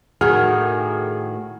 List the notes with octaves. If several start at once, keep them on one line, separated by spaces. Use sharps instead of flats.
A2 D#3 F#4 G#4 F6